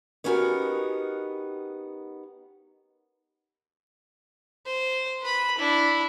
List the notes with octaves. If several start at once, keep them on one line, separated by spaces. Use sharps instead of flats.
B3 C#4 D#4 F#4 G4 A#4
C5
B4 B5
D4 E4